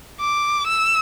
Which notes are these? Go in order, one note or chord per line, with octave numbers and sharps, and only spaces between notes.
D6
E6